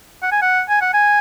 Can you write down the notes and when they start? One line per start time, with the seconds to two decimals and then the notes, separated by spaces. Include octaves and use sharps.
0.23 F#5
0.32 G#5
0.42 F#5
0.69 G#5
0.81 F#5
0.94 G#5